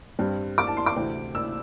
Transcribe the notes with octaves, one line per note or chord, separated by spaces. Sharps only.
G2 G3 C4
D6
A5
C6
D6
D2 C3 E3 C4
E6